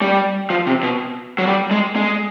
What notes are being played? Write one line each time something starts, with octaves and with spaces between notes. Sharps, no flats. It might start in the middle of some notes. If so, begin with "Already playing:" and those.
G3
F3
C3
B2
F#3
G3
G#3
G#3